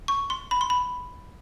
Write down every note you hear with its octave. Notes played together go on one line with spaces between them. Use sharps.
C#6
C6
B5
C6
B5